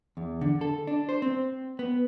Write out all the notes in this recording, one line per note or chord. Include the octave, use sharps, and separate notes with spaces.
E2
D3
A4
D4
C5
C4
B3